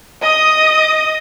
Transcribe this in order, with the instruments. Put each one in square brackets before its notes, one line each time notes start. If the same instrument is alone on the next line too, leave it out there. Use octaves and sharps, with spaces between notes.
[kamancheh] D#5 D#6